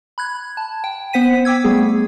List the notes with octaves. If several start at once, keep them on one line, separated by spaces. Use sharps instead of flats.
B5 F#6 G#6
A5
G5
B3 C5 F#5 B6 D#7
G5 D6 E6 G#6
G3 A3 B3 G#4